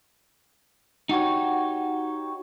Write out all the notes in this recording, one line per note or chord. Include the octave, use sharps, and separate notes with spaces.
D#4 F#4 G4 C#5